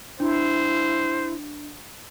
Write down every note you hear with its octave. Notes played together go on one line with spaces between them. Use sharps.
D4 E4 C5